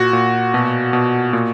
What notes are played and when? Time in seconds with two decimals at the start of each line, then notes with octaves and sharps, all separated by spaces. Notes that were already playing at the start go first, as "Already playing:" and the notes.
Already playing: A#2 F#4
0.13 A#2
0.54 B2
0.93 B2
1.33 A#2